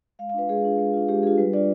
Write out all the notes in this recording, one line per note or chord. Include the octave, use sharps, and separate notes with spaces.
G#3 F5
F5
D4 F4 B4
G#3 G#4
D4 F4
G#3
D4 F4
G#3 G4
D4 F4 G#4
G3 B4
D4 F4 D5